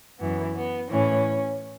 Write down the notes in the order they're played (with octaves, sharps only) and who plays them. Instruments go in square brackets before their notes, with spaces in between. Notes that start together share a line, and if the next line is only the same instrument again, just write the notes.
[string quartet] F#2 E3 B3
B3
A2 E3 C#4